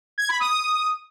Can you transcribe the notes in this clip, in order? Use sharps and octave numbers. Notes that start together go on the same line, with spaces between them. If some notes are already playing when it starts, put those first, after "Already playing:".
G#6
B5
D#6